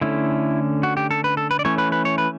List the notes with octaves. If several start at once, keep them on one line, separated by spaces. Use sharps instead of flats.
D3 A3 C#4 E4
F#4
G4
A4
B4
A4
B4
D5
E3 A3 C#4 C#5
B4
B4
C#5
B4